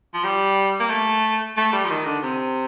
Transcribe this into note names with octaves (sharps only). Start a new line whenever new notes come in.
F3
G3
A#3
A3
A3
G3
F3
D#3
D3
C3